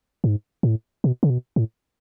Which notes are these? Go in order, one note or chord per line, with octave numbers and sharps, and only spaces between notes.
G#2
A2
B2
C#3
B2
A2